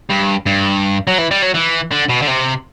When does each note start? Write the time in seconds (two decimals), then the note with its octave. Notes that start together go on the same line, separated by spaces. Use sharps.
0.10 G2
0.46 G2
1.07 F#3
1.18 E3
1.31 G3
1.42 F#3
1.54 E3
1.91 D3
2.09 B2
2.22 D3
2.27 C3